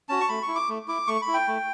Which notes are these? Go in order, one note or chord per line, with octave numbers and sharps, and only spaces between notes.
C#4 F#4 A5
C#6
A3 B5
C#6
E4
D6
A3
E4 D6
A3 C#6
B5
E4
G5
A3